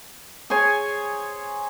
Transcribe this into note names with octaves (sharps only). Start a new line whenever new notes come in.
G#4 C5 C#5 G#5